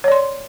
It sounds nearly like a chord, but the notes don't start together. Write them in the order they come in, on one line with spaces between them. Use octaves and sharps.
C#5 D5 C6